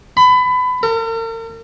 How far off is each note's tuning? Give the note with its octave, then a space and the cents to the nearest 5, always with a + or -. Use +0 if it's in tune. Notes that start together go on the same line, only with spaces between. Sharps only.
B5 +25
A#4 -45